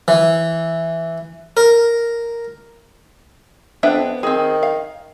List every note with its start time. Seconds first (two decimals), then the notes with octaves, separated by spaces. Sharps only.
0.08 E3
1.57 A#4
3.83 F2 B3 D4 E5
4.23 D#3 C4 G#4
4.63 F5